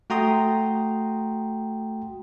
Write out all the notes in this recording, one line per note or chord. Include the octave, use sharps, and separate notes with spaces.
A3 F#4 G5 A#5 C6 D#6